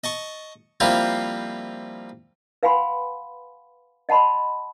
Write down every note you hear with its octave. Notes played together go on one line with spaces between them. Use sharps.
D#5 A5 C#6
F3 G3 A#3 C4 E4 F4
B4 F5 F#5 G#5 B5 C6
D#5 F#5 A5 B5 C6